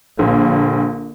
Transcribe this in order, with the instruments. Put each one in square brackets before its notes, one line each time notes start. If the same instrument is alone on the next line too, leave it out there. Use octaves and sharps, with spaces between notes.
[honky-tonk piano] A#1 [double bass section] D3 A#3